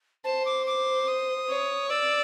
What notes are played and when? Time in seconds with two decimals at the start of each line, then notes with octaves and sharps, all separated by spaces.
0.24 C5 A5
0.45 D6
0.66 D6
1.08 D#6
1.49 C#5
1.90 D5 E6